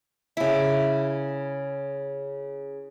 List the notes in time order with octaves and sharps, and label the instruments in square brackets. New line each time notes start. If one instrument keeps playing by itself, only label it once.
[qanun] C#3 E4